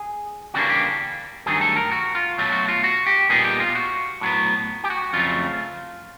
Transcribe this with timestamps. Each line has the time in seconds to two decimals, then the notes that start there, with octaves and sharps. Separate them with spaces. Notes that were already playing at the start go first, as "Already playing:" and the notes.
Already playing: G#4
0.54 C#3 E3 G3 A#3 D4 F#4
0.70 G4
1.46 G2 D#3 F#3 A3 G#4
1.61 A4
1.76 A#4
1.92 F#4
2.15 F4
2.38 B2 F#3 A3
2.52 F#4
2.68 F4
2.84 F#4
3.06 G4
3.29 A#2 G3 B3 D#4 G#4
3.45 G4
3.60 F4
3.75 F#4
4.21 A2 F#3 B3
4.84 G4
4.90 F#4
5.13 F2 C#3 F#3 A3 F4